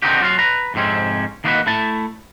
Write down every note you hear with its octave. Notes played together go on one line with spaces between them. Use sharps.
D3 D#3 C4 D#4 F#4 G4
F#3 F4 F#4 F5
B4 A#5
F2 G#2 C3 C4 C#4
D#3 A#3 B3 D#4 F#4 B4
A3 E4 A5